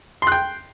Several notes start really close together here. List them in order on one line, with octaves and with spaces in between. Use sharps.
C6 F#6 G5